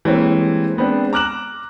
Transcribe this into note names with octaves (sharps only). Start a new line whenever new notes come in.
E3 G3 G#3 A#3 C4 C#4
G#3 B3 C4 D4
A#5 D6 F6 F#6 E7 F#7